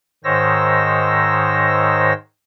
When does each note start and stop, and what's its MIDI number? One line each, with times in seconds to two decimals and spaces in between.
0.24 2.13 44
0.24 2.13 51
0.24 2.13 72
0.24 2.13 73
0.24 2.13 88
0.24 2.13 94